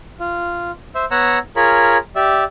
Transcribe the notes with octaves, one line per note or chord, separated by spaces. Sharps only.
F4
C5 E5
B3 C#5 F#5 A#5 E6
F4 G#4 A#4 C#5 B5
G4 D5 E5